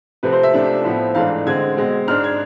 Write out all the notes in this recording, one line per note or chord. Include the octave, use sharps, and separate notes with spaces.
C3 F3 A3 C4 B4
C5
E5
C3 F3 A3 D4
A2 F3 B3
G#2 E3 A3 D4 F5
D3 G#3 C4 G#6
B2 G#3 C4
G#2 G#3 D4 F6
G#6